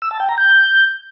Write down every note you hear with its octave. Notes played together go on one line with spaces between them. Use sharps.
E6
A5
G5
A#5
G6